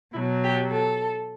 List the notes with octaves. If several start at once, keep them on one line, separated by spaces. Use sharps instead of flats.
B2 F#3 E4
G4
A4